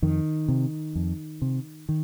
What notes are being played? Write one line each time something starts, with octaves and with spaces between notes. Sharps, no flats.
F2 D#3
C3
F2
C3
D#3